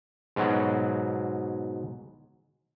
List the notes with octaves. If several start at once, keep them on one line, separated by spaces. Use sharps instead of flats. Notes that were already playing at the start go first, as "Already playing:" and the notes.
G#2 B2 F#3